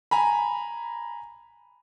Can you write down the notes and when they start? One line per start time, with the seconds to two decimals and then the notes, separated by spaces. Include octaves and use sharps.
0.11 G#5 A#5 B5